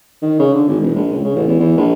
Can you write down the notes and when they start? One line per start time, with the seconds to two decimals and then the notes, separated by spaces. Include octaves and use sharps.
0.22 D#3
0.39 C#3
0.54 D3
0.67 G#1
0.81 E1
0.95 A#1
1.12 C#2
1.24 C#3
1.35 A1
1.48 E2
1.59 E2
1.77 A#1